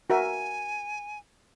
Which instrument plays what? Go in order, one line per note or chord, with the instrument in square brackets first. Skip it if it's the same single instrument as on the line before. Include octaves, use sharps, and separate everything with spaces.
[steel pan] F#4 A#4 E5 [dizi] G#5